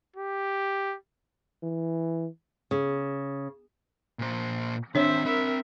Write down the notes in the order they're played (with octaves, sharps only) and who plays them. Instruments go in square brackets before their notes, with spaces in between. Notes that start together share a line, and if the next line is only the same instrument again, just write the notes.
[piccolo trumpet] G4
[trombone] E3
[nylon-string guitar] C#3
[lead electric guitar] A#2 C5
[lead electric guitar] D#3 C4 [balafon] D4 C#5 [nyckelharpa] C5 E5
[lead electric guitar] C4 B5 [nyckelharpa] A#4 E5